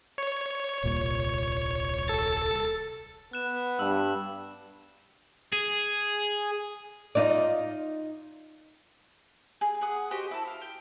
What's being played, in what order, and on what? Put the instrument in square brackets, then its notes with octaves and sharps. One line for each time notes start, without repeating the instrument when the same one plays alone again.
[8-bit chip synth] C#5
[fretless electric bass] D#1 C2 A#2
[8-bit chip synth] A4 A6
[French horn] B3 [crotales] F#6 E7
[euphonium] G2 [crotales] E6
[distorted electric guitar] G#4
[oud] D#4 F4 D5
[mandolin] G#4
G#4 F#5 D#6
F#4 G4 C5 D#5
E4 A5
F5
G5